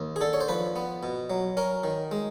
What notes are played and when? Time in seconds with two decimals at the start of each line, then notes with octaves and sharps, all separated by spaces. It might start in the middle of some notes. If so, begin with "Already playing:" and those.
Already playing: D#2
0.16 G#4
0.21 D3 A4
0.33 C#5
0.41 C5
0.48 F3 B4
0.76 B3
1.03 B2
1.30 F#3
1.57 C#4 A#4
1.84 D#3
2.11 G#3